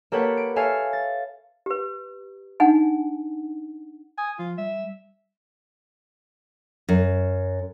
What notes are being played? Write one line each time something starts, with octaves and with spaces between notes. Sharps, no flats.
A#3 G4 A4 B4 C#5 F#5
D7
A4 C#5 E5 F5 G#5
A6
G4 B4
D4 D#4 F#5 G#5
G#5 D#6
F3 F4
G3 E5
F#2